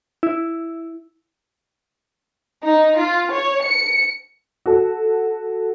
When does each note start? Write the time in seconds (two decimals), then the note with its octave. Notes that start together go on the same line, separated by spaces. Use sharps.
0.23 E4
2.65 D#4
2.99 F4
3.32 C#5
3.63 C#7
4.66 F#4 A4